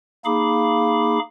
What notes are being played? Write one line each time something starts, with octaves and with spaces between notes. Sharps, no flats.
A#3 D#4 G#4 F5 B5 D6